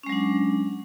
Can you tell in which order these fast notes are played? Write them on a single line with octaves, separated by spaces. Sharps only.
C#4 G#3 F#3 D4